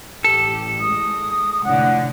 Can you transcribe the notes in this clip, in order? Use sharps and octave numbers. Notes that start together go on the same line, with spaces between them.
A1 G4 A4
G#3 D#6
F1 A2 D3 F#5